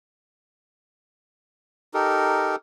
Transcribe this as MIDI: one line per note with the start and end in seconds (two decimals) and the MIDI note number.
1.94 2.56 63
1.94 2.56 67
1.94 2.56 69
1.94 2.56 70